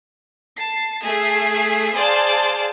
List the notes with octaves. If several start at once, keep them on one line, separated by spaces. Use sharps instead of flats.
A5 C7
A3 G#4 E5 C7
G#4 C5 D5 F5 A5